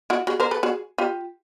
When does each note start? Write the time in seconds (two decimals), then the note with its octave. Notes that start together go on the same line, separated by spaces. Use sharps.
0.10 E4 F#4
0.27 F#4 G#4
0.40 A#4 C5
0.51 A4 B4
0.63 F#4 G#4
0.98 F4 G4